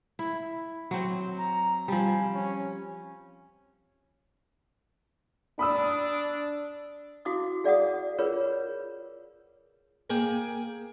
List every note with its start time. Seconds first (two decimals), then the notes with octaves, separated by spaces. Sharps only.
0.19 E4
0.91 F#3 C4
1.39 A#5
1.88 F3 G3 G#5
2.33 C#4
5.59 D4 B5 D#6 E6
7.25 E4 F#4 F5 D6 D#6
7.64 G#4 D5 F5 F#5 D#6
8.18 F4 G#4 A#4 B4 C#5
10.09 A#3 G#4 G5 G#5